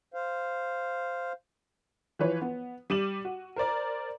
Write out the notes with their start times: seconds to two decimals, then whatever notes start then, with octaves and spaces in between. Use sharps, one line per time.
0.14 C5 F5
2.19 E3 F3 B4 C#5
2.42 B3
2.90 G3 D6 D#7 E7 F#7
3.25 F#4
3.56 A#4 C5 D5 A#5